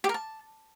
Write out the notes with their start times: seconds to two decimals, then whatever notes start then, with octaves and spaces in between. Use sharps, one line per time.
0.04 G4
0.09 A#4
0.14 A5